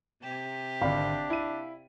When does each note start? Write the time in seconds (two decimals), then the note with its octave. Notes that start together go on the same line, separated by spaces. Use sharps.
0.22 C3 G4
0.81 G#1 D3 D4 D5 F5 B5
1.30 E4 D#7